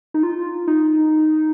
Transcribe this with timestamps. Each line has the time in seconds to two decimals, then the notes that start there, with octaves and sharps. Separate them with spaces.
0.14 D#4
0.23 F4
0.67 D#4